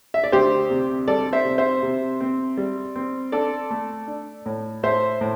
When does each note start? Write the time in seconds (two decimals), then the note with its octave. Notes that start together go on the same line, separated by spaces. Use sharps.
0.14 E5
0.24 D5
0.32 D2 G4 C5
0.70 C3
1.08 G3 A4 D5
1.33 C5 E5
1.45 C3
1.58 C5 E5
1.83 C3
2.21 C4
2.57 G3
2.96 C4
3.32 D4 A4 D5
3.71 A3
4.07 D4
4.46 A2
4.83 A2 C5 E5
5.21 A2